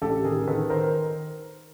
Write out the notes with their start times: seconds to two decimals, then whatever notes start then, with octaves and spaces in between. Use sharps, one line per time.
0.02 A1 G4 A4
0.24 D#3 G#4 A#4
0.47 D#3 A4 B4
0.70 A#4 C5